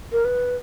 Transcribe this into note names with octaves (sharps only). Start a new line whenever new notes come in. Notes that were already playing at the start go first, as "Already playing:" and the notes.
A#4
B4